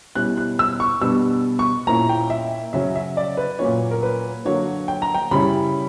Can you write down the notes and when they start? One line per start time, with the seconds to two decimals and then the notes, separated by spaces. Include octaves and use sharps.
0.15 B2 G3 C#4 E4 F#6
0.37 F#6
0.59 E6
0.80 C#6
1.01 B2 G3 B3 D4 E6
1.59 C#6
1.87 A#2 A#3 C#4 E4 A#5
2.09 G5
2.30 E5
2.73 C#3 F#3 C#4 E5
2.96 E5
3.17 D5
3.37 B4
3.59 A#2 F#3 A#3 C#4 C#5
3.91 A#4
4.03 B4
4.45 D3 F#3 A#3 C#5
4.88 G5
5.02 A#5
5.14 G5
5.31 C#3 G3 C#4 E4 B5